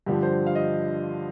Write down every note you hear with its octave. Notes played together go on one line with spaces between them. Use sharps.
G2 D3 F3 G4
C5
F5
D#5